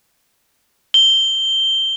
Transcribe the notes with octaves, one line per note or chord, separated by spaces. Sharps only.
G7